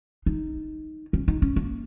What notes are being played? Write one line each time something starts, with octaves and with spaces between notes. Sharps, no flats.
D#4
C#4
D#4
C#4
A#3